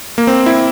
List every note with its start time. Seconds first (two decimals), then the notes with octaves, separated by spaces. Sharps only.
0.18 A#3
0.27 C4
0.46 E4